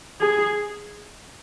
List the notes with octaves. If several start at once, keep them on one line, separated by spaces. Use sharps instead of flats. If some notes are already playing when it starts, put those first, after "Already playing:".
G#4